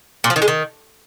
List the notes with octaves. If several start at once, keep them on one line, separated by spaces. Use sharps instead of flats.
A#2
F3
D#3
G#3
D#3